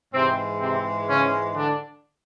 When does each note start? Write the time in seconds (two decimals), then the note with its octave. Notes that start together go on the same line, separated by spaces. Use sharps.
0.13 G#2 C3 E3 G#3 C4
0.60 C3 C4
1.08 C#3 C#4
1.55 D3 D4